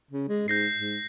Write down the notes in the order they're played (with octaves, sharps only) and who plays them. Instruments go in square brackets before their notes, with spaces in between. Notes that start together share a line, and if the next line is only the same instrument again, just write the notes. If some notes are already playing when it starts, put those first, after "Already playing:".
[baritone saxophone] C#3
G#3
[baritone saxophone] G#2 [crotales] G6 A#6 C7
[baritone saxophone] G#2